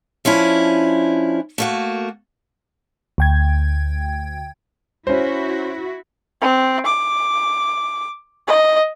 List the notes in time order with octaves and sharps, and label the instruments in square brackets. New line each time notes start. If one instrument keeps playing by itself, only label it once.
[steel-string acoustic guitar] F3 C#4 D4 E4
A3 A#3 F#4
[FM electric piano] D2 G5 G#6
[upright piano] C#4 C5 [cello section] E4 F#4
[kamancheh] C4
D6
D#5